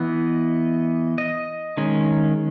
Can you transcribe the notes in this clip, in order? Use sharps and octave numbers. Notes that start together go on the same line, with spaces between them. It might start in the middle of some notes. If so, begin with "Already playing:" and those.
Already playing: E3 B3 D#5
D#5
D#3 G#3 C#4